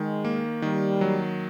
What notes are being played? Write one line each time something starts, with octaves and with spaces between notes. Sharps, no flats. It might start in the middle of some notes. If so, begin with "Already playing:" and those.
Already playing: D#3 G#3
A#3
D#3 G3
F#3